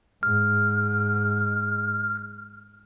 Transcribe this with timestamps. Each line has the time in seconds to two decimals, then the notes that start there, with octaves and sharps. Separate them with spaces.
0.23 G#2 F6